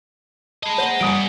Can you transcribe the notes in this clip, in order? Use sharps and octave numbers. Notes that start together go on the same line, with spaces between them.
G#4 D#5 A5 B5
A#3 C5 F#5
G2 G3 B3 G#5 D#6 D7